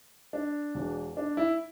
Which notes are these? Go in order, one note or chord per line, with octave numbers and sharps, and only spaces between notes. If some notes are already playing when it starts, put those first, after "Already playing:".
D4
E1 E2 B2
D4
E4